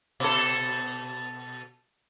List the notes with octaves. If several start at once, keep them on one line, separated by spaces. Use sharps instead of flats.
B2 A4